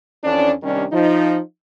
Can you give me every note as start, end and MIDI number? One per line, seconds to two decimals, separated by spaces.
0.23 0.51 41
0.23 0.51 52
0.23 0.51 61
0.23 0.51 62
0.63 0.84 48
0.63 0.84 51
0.63 0.84 55
0.63 0.84 61
0.63 0.84 62
0.93 1.37 53
0.93 1.37 63